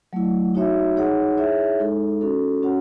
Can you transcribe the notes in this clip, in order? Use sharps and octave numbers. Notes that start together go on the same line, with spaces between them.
F#3 A3 E4
D#4 F#4 C#5 E5
D#4 G#4 C#5 F#5
E4 G#4 C#5 E5
G#3 D#4 A4
C#4 F#4 A4
C#4 F#4 C#5 F#5